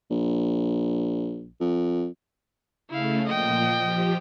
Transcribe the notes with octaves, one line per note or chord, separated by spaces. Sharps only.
A#1
F2
C#3 A3 E4 F5
A#2 F3 D#5 G5
F3 G4